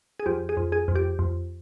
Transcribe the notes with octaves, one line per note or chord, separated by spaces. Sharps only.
G#4
F2 G4
G#4
F2
G#4
F2
G4
F2